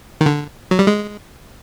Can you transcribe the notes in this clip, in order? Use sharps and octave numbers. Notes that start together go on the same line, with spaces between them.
D#3
D3
F#3
G3
G#3